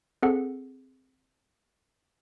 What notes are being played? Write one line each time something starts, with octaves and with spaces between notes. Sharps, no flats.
C4 G#4 A4 F#5